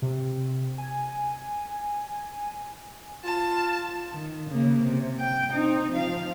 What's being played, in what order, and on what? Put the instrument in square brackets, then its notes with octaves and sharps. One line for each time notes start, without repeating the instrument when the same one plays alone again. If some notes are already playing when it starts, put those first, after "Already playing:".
[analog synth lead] C3
G#5
[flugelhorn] F4 [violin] A5
[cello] D#3
C#3 A#3
C3
G5
C4 D#4
F3 F5